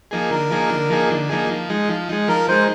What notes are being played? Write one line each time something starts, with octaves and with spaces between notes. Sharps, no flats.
F3 A#3 D#4 G#4
D3 A#4
F3 A#3 D#4 G#4
D3
F3 A#3 D#4 G#4
D3
F3 A#3 D#4 G#4
F3
G#3 D#4
F3
G#3 D#4
F3 A#4
G#3 D#4 C5